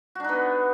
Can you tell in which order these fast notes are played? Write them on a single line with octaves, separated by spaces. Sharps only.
F#4 D4 D#4 B3